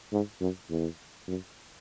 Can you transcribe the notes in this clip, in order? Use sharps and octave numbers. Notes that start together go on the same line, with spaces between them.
G#2
F#2
E2
F#2